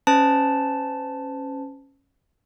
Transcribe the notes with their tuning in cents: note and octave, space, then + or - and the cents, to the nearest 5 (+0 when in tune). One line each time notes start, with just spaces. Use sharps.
C#4 -15 C5 -45 A5 +0